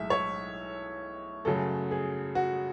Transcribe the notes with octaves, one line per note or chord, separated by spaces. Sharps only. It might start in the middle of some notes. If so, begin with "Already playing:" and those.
Already playing: B1 A2 G#3 E5
C#5
F#2 C#3 F#3 A3 A4
G#4
F#4